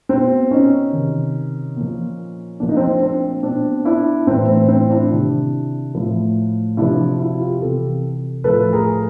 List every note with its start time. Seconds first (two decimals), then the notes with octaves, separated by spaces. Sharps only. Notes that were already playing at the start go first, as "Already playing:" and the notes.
0.09 B2 C4
0.51 C#4 D#4
0.93 C3 D#3
1.76 A#2 F3
2.60 A#2 F3 D4
2.69 D#4
2.77 C4 D4
3.02 C4 D4
3.43 B2 C4 D4
3.85 D4 E4
4.27 A2 E3 C4
4.49 C4
4.69 C4
4.90 D4 E4
5.11 C3 D#3 D4 E4
5.95 A2 F3
6.77 C3 F3 D4 E4
7.19 E4 F#4
7.41 F4 G4
7.61 C3 E3 G4 A4
8.44 A2 F3 A4 B4
8.73 G#4 A#4